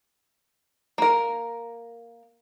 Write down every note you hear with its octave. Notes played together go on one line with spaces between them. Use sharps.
A#3 A#4